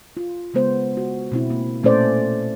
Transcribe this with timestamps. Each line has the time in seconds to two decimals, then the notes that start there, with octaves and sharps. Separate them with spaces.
0.17 F4
0.54 C#3 G#3 B3 C5
0.97 F#4
1.32 B2 C4 E4
1.50 A#3
1.83 A#2 A3 C#4 A4 C5 D5